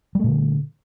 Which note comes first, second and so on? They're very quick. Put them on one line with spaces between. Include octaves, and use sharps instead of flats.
G3 A3 A#2 D3